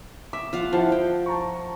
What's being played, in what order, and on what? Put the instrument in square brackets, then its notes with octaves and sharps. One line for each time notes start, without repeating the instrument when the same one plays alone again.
[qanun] E5 [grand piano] D6
[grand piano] F3 [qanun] F4 F5 F#5
[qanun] F3 [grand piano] E4 F#5 A5
[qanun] G5
[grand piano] A5 A#5 C#6